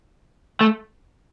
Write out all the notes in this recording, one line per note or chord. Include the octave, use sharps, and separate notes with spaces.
A3